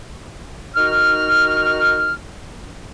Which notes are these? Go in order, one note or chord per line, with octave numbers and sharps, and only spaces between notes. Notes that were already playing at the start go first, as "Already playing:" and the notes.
D#3 D#4 F#4 F6